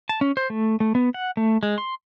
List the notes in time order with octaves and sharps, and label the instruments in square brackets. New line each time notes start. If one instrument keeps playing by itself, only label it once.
[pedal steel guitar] A5
C#4
C5
A3
A3
B3
F#5
A3
G#3
C6